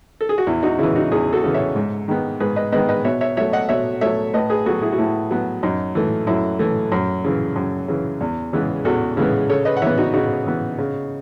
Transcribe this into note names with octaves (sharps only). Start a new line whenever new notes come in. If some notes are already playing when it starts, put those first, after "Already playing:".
A4
G#4
F#4
E2 E4
D#4 F#4
C#3 E3 E4
D#4 F#4
E2 E4 G#4
F#4 A4
C#3 E3
C#5 E5
G#2
D#3 G#3 B3
G#2 G#4 B4
B4 D#5
D#3 G#3 B3 B4 D#5
B4 D#5
B2 C#5 E5
C#5 E5
F#3 A3 C#5 E5
D#5 F#5
B2 C#5 E5
F#3 A3 C#5 E5
A2 B4 D#5
G#4 B4
F#3 B3 F#4 A4
E4 G#4
F#4
A2 E4
F#3 B3
F#2 D#4
E3 A3
F#2 E4
E3 A3
F#2
C#3 E3
F#2
C#3 E3
E2
C#3 E3 G#3 B3
E2 F#4 A4
C#3 E3 G#3 B3
C#3 A4 C#5
B4 D#5
F#5
E3 B3 C#5 E5
D#4 F#4
C#3 D#4 F#4
E3 B3
C#3